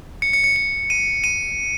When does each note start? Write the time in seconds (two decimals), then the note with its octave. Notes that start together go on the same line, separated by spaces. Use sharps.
0.22 C#7
0.33 C#7
0.44 C#7
0.56 C#7
0.90 D#7
1.24 D#7